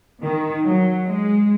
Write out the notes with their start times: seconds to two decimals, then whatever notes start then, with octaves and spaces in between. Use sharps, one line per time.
0.23 D#3
0.65 F#3
1.05 G#3